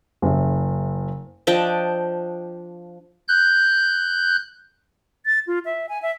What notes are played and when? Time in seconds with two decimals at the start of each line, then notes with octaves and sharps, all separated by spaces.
0.22 F#1 C#3 E5
1.47 F3 D4 D#5 G5
3.28 F#6 G6
5.26 A6
5.47 F4
5.65 E5
5.89 G#5
6.02 E5